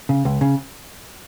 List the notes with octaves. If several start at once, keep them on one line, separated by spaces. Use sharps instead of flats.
C#3
C#2
C#3